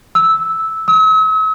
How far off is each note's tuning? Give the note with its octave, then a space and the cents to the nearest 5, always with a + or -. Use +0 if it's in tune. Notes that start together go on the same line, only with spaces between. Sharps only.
E6 -10
E6 -45